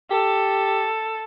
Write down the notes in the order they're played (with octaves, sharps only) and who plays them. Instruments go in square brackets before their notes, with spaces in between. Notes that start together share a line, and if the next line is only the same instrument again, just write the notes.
[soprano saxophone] G4 [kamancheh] A4